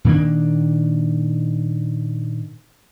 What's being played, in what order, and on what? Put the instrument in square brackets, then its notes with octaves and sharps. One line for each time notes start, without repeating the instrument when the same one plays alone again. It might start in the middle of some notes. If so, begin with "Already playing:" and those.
[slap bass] A#2 D#3 A#3 D4